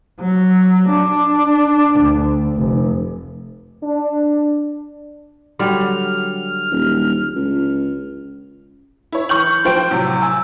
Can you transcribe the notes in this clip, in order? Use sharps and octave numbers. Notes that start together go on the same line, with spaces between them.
F#3
D4
D2
F1
D4
D3 F#3 G3 F6
D#1
C#2
E4 C#5
E3 C#6 F6 G6 F#7
F3 C5 G5 D7
A2 C3 F#3
G#5 E6